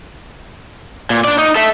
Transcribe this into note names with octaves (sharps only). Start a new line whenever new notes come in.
A#2
D4 D5
D#4
A4 E5